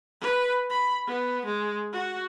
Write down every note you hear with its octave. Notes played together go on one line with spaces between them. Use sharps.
B4
B5
B3
G#3
F#4